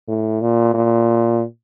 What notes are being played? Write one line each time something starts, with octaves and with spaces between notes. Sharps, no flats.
A2
A#2
A#2